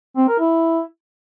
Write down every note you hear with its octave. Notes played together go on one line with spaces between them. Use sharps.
C4
A#4
E4